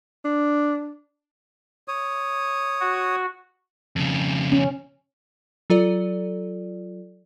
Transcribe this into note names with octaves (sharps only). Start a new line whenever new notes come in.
D4
C#5 D#6
F#4
F2 C#3
C#4
F#3 F4 A4 D5